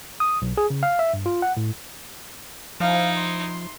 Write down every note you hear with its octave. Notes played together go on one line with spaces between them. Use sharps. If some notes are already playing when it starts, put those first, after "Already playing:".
D#6
B1
G#4
C#3
F5
E5
G2
F4
F#5
A2
F3 D#4 E4 F5
C6